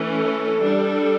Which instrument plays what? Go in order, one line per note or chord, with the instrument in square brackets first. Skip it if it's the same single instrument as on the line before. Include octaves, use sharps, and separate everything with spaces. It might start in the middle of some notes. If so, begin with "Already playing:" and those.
Already playing: [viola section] E3 A3 C#4
A4
G3 D4